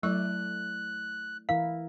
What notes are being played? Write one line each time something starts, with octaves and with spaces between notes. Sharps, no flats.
F#3 A3 E4 D5 C#6 F#6
E3 E4 A#4 F5